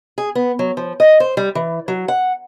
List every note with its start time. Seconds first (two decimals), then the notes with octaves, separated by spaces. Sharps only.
0.18 G#4
0.35 B3
0.59 F#3
0.77 F3
1.00 D#5
1.20 C5
1.37 G3
1.55 E3
1.88 F#3
2.08 F#5